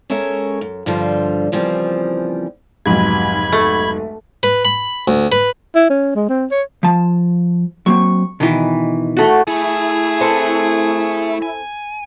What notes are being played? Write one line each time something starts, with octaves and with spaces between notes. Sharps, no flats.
G#3 C#4 A4 A#4 C#5 E5
F#2
G2 D3 F3 G3 F4 C5
C#3 E3 F3 G3 A#3 C4
F1 B1 G#2 B5 G#6
A3
B4
B5
D2
B4
E4
C#4
G#3
C4
C#5
F3 A5
F#3 A#3 C4 C#6
B2 D#3 E3
A3 F#4
A3 E4 G#4
C4 A4 B4
G#5